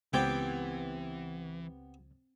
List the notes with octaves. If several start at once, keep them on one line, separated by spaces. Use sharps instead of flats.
C#2 E3 B3 C4 G4 G5 G#6 A6